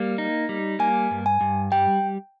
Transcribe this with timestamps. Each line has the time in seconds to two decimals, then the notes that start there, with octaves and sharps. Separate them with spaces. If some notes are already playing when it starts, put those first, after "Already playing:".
Already playing: G3 A#3
0.18 D#4
0.49 G3
0.79 A#3 G#5
1.11 G2
1.26 G#5
1.41 G2
1.72 G3 G5